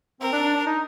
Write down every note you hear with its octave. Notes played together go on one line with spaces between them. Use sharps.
C4 A#4
D4
D4
D4
D#4